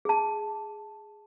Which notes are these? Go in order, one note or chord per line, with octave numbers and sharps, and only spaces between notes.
G#4 A5